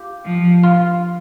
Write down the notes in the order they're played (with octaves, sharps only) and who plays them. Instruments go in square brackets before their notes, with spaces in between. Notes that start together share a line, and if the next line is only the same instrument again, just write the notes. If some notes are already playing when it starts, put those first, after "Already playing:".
Already playing: [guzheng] F4 G4
[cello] F3
[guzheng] F4